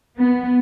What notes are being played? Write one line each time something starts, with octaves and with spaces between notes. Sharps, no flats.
B3